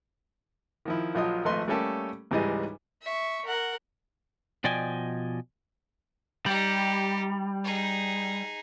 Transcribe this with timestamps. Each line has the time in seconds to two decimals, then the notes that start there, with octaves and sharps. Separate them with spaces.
0.85 D#3 F3 E4
1.15 A#1 F3 F#3 F4 D#5 D#6
1.45 G#1 F3 A3 B4 D#5 C6
1.68 G3 A3 A#3 C#4 G4 A4
2.31 C#2 G#2 E3 G3 G#4 D#5
3.02 E5 C#6
3.45 A#4 F#5
4.64 B2 F3 D5 D#5 G5 G#5
6.46 G3 D#4 G4
7.64 D#4 G#4